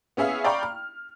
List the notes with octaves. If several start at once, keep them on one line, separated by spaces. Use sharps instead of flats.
B3 C#4 G#4 E5 F5
D5 F5 G5 A#5 B5 C#6
F6